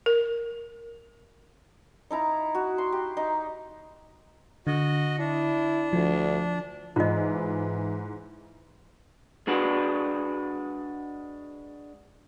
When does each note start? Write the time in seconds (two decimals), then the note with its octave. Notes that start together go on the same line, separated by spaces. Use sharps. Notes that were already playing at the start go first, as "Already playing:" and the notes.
0.06 A#4
2.11 D#4 E4 A#5
2.55 F#4
2.78 C6
2.92 G4
3.17 D#4
4.67 D3 F#4 D#5
5.19 D4 E4
5.93 D2 F3
6.96 G#2 E3 F4 D#5
9.47 G#3 D4 F#4 B4